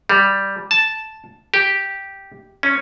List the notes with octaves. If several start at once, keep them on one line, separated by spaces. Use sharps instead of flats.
G3
A5
G4
C#4